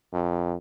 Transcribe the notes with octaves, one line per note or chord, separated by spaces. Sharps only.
F2